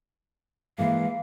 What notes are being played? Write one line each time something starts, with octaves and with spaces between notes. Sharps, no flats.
E3 G#3 A#3 F5